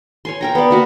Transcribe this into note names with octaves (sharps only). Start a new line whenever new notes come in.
C#5 G#5 C6
A#4 G5 A#5
B3 D5
A#3 F#4 B4